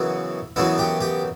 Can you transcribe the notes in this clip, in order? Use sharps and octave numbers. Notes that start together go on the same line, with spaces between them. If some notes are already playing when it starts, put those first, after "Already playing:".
Already playing: F#2 C#3 E3 B3 E4
F#2 C#3 E3 B3 E4
G4
G4